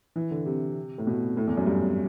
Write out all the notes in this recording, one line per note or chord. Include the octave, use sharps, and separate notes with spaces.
E3
D3
C3
A2
B2
A2
E2
F#2
G2